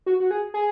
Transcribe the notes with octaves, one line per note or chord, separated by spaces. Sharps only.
F#4
F#4
G#4
G#4